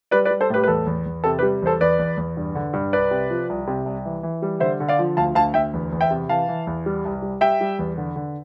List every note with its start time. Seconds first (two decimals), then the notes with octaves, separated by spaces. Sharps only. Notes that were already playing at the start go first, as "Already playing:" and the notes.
0.11 G3 B4 D5
0.25 B4 D5
0.30 G3
0.41 A4 C5
0.50 A2 G4 B4
0.64 B4
0.68 E2 A4
0.87 E2
1.06 E2
1.24 C3 A4
1.39 G4 B4
1.43 G3
1.62 E2 A4 C5
1.80 E2 B4 D5
1.99 E2
2.18 E2
2.37 G2
2.55 D3
2.73 G2
2.93 C2 B4 D5
3.11 C3
3.30 F3
3.49 C2
3.67 C3
3.85 C2
4.05 E3
4.23 E3
4.42 G3
4.60 D3 C5 E5
4.80 D3
4.89 D5 F5
4.99 F3
5.17 D2 F5 A5
5.35 D2 F5 A5
5.54 D2 E5 G5
5.74 E2
5.92 E2
6.01 E5 G5
6.11 C3
6.29 E3 F5 A5
6.48 E3
6.67 E2
6.86 G3
7.05 C2
7.22 G3
7.41 G3 E5 G5
7.61 G3
7.79 E2
7.97 D3
8.16 D3